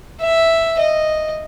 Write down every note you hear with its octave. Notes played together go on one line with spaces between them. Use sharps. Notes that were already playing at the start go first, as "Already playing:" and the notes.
E5
D#5